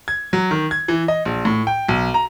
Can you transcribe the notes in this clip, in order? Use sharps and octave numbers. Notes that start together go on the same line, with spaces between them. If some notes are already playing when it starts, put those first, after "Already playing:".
G#6
F#3
D#3
G#6
E3
D#5
A#1
A2
G5
B1
A#5